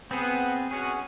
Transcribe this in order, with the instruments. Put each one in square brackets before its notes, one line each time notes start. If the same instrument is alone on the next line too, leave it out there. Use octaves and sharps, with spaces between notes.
[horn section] B3 [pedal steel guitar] C4 G#4
[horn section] B2 C#4 F#4 [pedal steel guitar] G#4